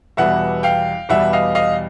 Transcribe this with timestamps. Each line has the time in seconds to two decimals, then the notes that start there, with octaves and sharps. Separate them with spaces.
0.17 E2 B2 G3 E5 F#5
0.63 F5 G5
1.09 E2 B2 G3 E5 F#5
1.33 D#5 F5
1.55 D#5 F5